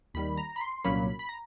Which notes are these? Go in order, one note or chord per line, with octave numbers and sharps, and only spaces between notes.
D#2 D#3 G3 B5
A#5
B5
C6
C2 A#2 F#3 A#3 C#4 B5
B5
A#5